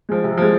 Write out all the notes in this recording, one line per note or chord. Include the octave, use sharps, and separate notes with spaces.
F3 G#3
C3
F3 G#3